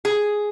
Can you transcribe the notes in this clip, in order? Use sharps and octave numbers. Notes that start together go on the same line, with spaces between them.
G#4